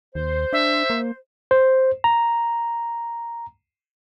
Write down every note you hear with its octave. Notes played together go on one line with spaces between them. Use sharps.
D#2 C5
D4 E5
A#3
C5
A#5